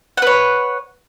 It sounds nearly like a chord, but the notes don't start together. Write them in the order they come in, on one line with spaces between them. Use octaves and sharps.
F#5 B4 C#5